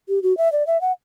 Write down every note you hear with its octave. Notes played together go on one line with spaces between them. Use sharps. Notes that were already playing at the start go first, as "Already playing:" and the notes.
G4
F#4
E5
D5
E5
F#5